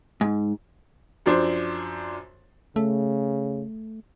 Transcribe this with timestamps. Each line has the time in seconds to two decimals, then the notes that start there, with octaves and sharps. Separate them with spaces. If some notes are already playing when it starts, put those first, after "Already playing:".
0.21 G#2
1.26 F#2 F3 D4 C5
2.76 C#3 A3